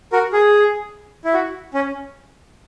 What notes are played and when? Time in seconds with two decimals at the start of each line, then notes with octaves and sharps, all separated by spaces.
0.12 F#4 A#4
0.33 G#4
1.25 E4
1.34 F#4
1.74 C#4